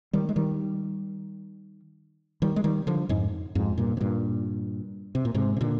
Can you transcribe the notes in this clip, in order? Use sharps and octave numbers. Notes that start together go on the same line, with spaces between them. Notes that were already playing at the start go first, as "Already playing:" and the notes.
D#3 G3
G#3
D#3 G3
D#3 G3
G#3
D#3 G3
D3 F3
F2 G#2
F2 G#2
G2 A#2
C3
G2 A#2
C3
A#2
G#2 C3
C3
A#2 D3